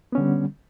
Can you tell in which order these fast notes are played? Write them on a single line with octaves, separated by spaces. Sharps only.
B3 C#4 D3 G3